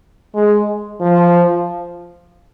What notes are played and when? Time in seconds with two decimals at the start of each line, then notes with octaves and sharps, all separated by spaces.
0.35 G#3
1.01 F3